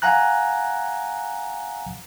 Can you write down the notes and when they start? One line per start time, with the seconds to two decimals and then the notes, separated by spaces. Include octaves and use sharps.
0.02 F5 F#5 G#5 A#5 F#6